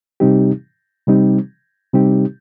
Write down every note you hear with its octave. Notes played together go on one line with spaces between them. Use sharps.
C3 G3 C4 D#4 G4
C3 G3 C4 D#4 G4
C3 G3 C4 D#4 G4